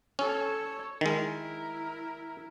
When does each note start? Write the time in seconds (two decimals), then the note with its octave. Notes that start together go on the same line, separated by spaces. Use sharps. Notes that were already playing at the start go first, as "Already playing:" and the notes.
0.19 C#4 A4 C#5
1.01 D#3 G#3 E4 A#4